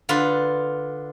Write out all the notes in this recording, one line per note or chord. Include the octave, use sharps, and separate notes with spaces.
D3 F4 B4